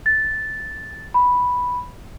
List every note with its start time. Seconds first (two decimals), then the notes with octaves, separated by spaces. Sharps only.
0.06 A6
1.14 B5